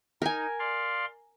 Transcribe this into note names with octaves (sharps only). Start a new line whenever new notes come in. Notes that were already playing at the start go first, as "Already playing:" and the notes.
D#4 A#4 G#5
D5 F5 C6